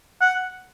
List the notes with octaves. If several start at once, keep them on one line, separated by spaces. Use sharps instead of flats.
F#5